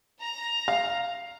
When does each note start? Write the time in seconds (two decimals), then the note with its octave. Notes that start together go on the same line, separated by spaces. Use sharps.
0.20 A#5
0.68 F5